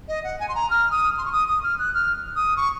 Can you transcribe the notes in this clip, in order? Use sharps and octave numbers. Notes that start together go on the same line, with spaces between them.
D#5
F#5
G#5
C6
A#5
F6
D#6
C6
C#6
D#6
D#6
F6
F#6
F6
D#6
C#6